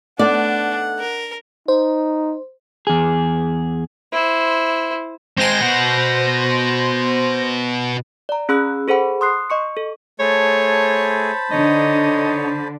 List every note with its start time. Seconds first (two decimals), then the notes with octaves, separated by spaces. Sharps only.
0.19 A3 B3 D4 D#4 D5 F#5
1.00 A#4
1.68 D#4 C5
2.87 E2 G#4
4.13 E4 C5
5.38 G#3 C4 C5 A#6
5.61 B2 F#5
8.29 D5 A#5
8.49 C#4 G#4 B5 E6 F#6
8.88 G#4 A4 C5 F#5 B5
9.21 C6 D#6 F#6 C7
9.50 D#5 C#6 C#7
9.77 A4
10.20 A3 G#4 C5 C#5 A5 B5
11.52 D3 D#4 C#5 D#5